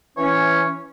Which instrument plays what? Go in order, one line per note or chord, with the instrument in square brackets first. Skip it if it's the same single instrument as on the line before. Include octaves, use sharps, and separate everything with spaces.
[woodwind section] E3 C#4 C#5